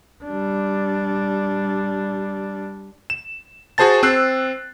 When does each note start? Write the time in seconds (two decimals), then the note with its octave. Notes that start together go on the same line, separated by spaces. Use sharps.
0.24 G3 D4
3.10 E7
3.78 F#4 G#4 C5 A5 A6
4.03 C4 E6 F#6 C7